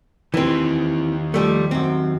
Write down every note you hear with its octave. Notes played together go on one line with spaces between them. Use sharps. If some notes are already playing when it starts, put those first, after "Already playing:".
D#3 E3 C4 G4
F3 G3 A3
F#2 C4